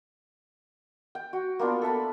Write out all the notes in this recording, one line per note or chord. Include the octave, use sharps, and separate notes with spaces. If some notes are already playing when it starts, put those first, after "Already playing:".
G5
F#4
A#3 B3 D4 F4
A4 E5 A5 B5